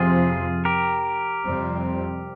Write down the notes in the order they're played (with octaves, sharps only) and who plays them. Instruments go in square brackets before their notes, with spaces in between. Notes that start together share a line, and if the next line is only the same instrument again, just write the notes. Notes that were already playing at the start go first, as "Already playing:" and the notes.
Already playing: [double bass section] F2 C3 F3 C4 [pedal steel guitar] F4 G#4
[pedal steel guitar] G4 A#4
[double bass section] F2 C3 G3 C4